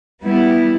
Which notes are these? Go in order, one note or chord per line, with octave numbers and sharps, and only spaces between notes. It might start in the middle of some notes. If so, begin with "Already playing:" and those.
G3 B3 E4